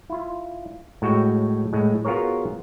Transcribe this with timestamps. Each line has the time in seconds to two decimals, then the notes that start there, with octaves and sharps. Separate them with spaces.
0.10 E4 F4
1.02 A2 G#3 F#4 C#5 G5
1.73 A2 G#3
2.05 B3 F4 F#4 G#4 A#4 C#5